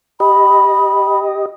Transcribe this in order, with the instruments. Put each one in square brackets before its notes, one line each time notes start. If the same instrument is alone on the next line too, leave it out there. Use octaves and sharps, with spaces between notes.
[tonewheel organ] G4 D#5 [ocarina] B5